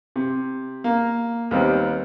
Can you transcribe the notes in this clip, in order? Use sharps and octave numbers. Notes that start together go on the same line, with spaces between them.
C3
A#3
D#2 D#3 G3 B3 C4